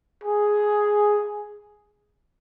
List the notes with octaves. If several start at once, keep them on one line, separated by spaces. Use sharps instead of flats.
G#4